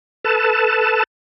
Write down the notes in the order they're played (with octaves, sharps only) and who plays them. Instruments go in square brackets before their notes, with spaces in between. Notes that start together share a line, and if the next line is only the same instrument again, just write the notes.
[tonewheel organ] A4 B4 A5